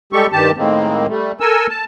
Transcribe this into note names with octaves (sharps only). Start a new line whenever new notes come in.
G3 G#3 G4 A4 C#6
G2 D#3 G4 A5
A2 D#3 G#3 A#3 C4
G3 A3
A4 A#4 G#5 E6
A5